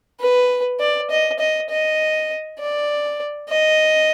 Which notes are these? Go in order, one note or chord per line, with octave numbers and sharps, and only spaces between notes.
B4
D5
D#5
D#5
D#5
D5
D#5